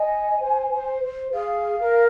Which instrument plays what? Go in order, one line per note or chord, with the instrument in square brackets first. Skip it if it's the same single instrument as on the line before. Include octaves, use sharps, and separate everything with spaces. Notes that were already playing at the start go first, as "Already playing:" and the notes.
Already playing: [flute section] D#5 [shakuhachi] G#5
[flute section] C5
C5
C5
[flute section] G#4 [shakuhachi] F5
[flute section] A#4